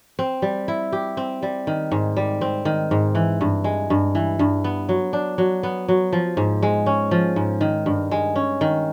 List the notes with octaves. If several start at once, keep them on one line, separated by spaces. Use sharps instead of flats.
C4
G3
E4
G4
C4
G3
D#3
G#2
G3
C4
D#3
G#2
E3
G2
G#3
G2
E3
G2
B3
F#3
D4
F#3
B3
F#3
F3
G#2
G#3
C#4
F3
G#2
D#3
G2
G#3
C#4
D#3